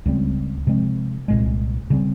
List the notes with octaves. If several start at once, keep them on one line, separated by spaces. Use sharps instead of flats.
C#2 C#3 G3 C4
C3 F3 G#3 C4
C2 A#2 G#3
C#3 G3 C4